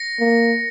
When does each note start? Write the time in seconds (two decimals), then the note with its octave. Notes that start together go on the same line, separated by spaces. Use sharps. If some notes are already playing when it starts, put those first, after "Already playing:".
Already playing: A#6 C#7
0.20 A#3